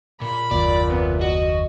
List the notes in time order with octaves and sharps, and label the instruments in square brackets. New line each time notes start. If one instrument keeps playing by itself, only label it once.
[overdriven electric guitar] A#2 [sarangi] B5
[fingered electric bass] F#1 D#2 [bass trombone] A#2 [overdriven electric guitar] D5
[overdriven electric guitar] C3 [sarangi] B3
[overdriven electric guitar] F#4 [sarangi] D#5